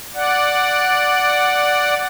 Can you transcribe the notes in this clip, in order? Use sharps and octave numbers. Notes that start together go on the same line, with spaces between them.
D5 F#5